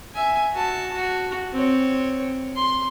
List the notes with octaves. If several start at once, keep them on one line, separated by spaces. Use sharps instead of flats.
E5 G#5
F#4 A5
F#4
C4 C#5
C6